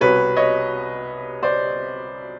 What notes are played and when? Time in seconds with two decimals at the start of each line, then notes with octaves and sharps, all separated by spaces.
0.01 C2 B2 G3 B4 C#5
0.36 C#5 D#5
1.43 C5 D5